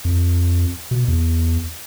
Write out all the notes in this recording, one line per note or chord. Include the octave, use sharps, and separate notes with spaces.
F2
B2
E2